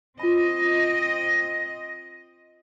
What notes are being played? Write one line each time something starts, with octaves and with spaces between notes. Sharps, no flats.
C4 F4 D#5 B5